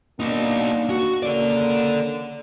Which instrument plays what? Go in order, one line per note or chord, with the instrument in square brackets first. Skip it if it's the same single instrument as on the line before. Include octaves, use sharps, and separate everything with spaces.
[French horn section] A#3 D4 [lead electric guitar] B3 D#4
[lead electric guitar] F#4
[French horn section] C#3 A#3 [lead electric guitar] A4 D5